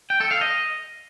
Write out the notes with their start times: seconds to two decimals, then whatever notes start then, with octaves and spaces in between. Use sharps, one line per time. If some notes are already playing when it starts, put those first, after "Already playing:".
0.10 G5
0.21 A4
0.31 F5
0.41 D#5